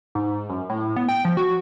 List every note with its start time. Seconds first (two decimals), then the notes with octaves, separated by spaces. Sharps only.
0.15 G#2
0.49 F#2
0.70 A2
0.96 B3
1.09 G5
1.25 F3
1.37 F#4